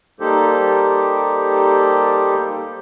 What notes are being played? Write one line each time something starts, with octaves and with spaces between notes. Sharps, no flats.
G3 A#3 D#4 G4 A4 C5